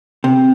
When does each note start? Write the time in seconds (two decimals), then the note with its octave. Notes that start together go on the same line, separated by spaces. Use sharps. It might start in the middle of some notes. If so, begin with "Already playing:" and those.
0.24 C3